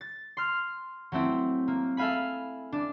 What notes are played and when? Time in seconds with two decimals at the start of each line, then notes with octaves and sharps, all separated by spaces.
0.01 A6
0.37 C6 F6
1.12 F#3 A3 C4 E4
1.68 A#3
1.97 A4 E5 F5 G#5 B5
2.72 D4